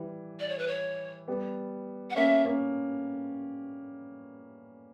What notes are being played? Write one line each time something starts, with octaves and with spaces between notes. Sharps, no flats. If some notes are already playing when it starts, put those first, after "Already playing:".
Already playing: E3 G3
D5
C#5
B4
C#5
G3 B3
F#5
A#3 C#4 E5
A#3 C#4